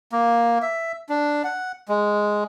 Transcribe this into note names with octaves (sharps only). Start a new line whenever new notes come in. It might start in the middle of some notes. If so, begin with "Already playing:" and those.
A#3
E5
D4
F#5
G#3